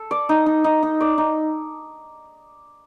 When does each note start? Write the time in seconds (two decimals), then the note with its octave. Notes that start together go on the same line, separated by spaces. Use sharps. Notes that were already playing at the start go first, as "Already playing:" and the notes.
Already playing: A4
0.11 D5
0.29 D#4
0.46 D#4
0.64 D#4
0.83 D#4
1.01 D5
1.18 D#4